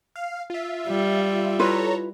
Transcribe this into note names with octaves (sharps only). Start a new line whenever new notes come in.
F5
F4 E5
G3
E4 F4 A4 B4 C#5 A#5